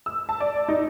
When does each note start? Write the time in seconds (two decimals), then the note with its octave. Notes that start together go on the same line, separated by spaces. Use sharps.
0.06 E6
0.29 A5
0.40 D5
0.68 D#4